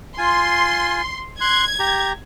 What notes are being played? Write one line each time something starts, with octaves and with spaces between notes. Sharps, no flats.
F4 G#5 C6
C6 F#6 G#6
G4 A#5